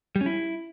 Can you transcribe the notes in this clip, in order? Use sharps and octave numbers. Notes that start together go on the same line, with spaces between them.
G3
C#4
E4